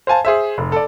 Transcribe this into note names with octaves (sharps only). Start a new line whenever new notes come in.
C5 F5 G#5 A5
G#4 C5 E5
F1
A4 D5